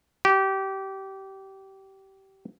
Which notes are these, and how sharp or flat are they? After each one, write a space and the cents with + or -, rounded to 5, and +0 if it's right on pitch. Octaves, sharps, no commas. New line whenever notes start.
G4 -25